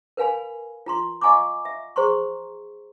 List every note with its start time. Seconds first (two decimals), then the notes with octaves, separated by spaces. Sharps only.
0.17 A#4 B4 F5 G#5 B5
0.86 F4 A#5 C6
1.21 D#5 F5 G#5 A#5 C#6 D6
1.65 E5
1.96 G#4 C5 A#5 C6 C#6